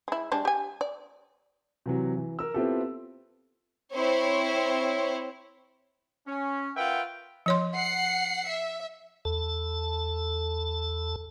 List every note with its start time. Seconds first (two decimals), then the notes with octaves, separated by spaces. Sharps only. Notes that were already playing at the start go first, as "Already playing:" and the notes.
0.08 G#3 E4
0.32 G3 G#3 D4
0.45 G4 G#5
0.81 D5
1.86 C3 E3 F#3
2.17 E3
2.39 A#4 E6
2.54 B3 C4 E4 F4 G4 A4
3.93 C4 E4 C5 C#5
6.27 C#4
6.76 F4 A#4 B4 E5 F#5 G5
7.46 F3 C#5 C6
7.76 F#5 C7 C#7
8.49 E5
9.25 E2 A4 A5